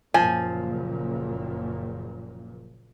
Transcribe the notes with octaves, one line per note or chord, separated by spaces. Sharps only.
F#1 A#2 F3 G#5